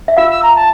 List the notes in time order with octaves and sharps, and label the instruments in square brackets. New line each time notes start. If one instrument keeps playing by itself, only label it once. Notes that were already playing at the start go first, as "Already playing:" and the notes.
[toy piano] E5
[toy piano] F4 F5 [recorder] E6
[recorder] E6
A#5
A5